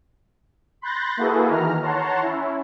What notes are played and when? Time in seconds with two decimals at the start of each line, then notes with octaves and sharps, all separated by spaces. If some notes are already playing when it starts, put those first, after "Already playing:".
0.81 B5 C6 F#6 G6 A6 A#6
1.17 A#3 E4 F#4 G#4 A4 B4
1.49 D#3 E3 A#5 F6
1.82 C#5 F#5 A5 A#5 C6
2.22 C#4 E4